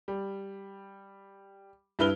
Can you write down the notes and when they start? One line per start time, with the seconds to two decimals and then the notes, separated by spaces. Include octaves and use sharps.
0.08 G3
1.99 G2 E4 B4 F6 G7